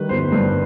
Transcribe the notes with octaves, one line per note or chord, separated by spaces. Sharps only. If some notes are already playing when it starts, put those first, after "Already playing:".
Already playing: D#3 G3 B4
G1 C5
G2